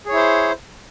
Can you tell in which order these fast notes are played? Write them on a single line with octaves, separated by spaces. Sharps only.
G#4 C#5 E4 C5